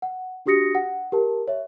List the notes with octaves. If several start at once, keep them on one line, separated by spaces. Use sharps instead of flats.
F#5
D4 F#4 G4 D#6 A#6 C#7
F#5
G4 A#4 A5
C#5 E5